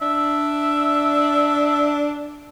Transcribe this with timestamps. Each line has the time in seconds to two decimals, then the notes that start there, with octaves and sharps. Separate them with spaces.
0.02 D4 E5